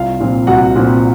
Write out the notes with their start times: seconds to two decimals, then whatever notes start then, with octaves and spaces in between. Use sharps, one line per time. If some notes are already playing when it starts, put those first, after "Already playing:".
Already playing: C2 F4 F5
0.20 A#2 F3 C4
0.47 C2 F#4 F#5
0.76 A#2 F3 C4